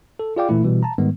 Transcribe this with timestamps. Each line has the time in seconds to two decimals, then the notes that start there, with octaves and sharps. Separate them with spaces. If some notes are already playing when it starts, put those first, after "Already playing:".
0.19 A4
0.36 F4 G#4 D5 F5 G5 D6
0.49 A#2 E3 A3 E4
0.64 B2 E3 G3
0.83 A5 A#5
0.98 G#2 D#3 G3 G#3 B3